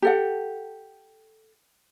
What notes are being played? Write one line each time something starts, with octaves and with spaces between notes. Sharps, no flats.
G4 A4 F#5